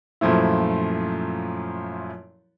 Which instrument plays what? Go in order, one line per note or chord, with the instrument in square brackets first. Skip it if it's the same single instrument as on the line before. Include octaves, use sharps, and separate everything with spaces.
[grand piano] F#2 A#2 F3 A3 E4